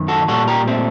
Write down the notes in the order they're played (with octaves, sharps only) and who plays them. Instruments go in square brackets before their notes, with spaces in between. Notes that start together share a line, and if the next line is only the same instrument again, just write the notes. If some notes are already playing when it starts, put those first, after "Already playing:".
Already playing: [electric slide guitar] F#2 D#3
F#4 A4
A#2 G3 F#4 A4
G4 A#4
A3 C4